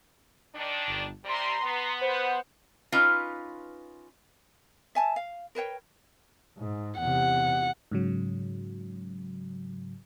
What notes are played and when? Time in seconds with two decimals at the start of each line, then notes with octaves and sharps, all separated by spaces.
0.55 D#3 D4
0.88 G1
1.25 C3 G3 A#5 C6
1.62 B3
2.01 C5 F#5
2.92 C#4 D#4 F4 B4
4.95 E5 G#5 A5
5.16 F5
5.55 A#4 B4 C#5 G5
6.58 G#2
7.00 E2 C3 F#5
7.91 G#2 C#3 F#3